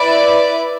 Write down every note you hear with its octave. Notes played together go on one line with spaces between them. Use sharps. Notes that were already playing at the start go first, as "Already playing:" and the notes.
Already playing: E4 B4 D5